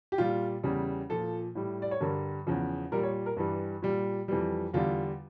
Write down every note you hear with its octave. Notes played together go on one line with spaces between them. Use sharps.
G4
A#2 G3 F4
E2 C#3 G3
A#2 F3 A4
A2 G3
D5
C#5
G2 D3 G3 A#4
E2 C#3 F3
A#2 G3 A#4
C#5
A#4
G2 E3 G3
A#2 G3
F2 E3 G3
E2 D3 G3 F4